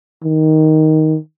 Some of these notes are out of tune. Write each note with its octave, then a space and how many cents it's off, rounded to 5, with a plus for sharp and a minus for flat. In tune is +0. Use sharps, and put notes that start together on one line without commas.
D#3 +10